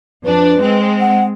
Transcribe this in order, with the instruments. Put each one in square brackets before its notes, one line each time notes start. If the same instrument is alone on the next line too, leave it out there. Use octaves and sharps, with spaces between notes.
[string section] F2 D4 [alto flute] B4
[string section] G#3 C4
[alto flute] F#5